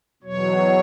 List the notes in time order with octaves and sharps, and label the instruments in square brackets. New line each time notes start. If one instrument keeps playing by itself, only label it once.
[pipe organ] E2 B2 F#3 C#5